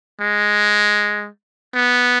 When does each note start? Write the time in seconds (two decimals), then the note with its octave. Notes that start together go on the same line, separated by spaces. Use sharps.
0.21 G#3
1.75 B3